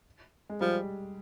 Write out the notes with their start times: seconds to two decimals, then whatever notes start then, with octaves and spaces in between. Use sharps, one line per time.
0.49 G#3
0.61 F3 G3